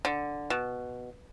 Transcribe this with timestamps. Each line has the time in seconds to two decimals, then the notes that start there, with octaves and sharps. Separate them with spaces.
0.05 D3
0.50 B2